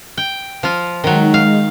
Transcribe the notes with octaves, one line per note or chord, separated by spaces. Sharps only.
G5
F3 F4
D#3 F#3 G#3 D#4
F5